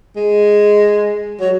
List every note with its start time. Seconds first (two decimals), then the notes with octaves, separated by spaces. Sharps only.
0.16 G#3
1.40 F#3